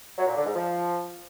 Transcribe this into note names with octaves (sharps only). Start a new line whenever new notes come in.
F#3
A#2
D3
G#2
F3